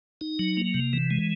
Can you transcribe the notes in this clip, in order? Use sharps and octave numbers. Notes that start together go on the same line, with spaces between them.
D#4
F#3
A#3
C3
E3
G#3